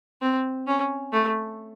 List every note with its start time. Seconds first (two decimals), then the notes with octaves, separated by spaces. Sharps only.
0.22 C4
0.67 C#4
1.12 A3